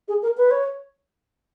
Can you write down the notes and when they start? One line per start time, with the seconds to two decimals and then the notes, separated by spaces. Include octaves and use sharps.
0.08 G#4
0.23 A#4
0.37 B4
0.51 C#5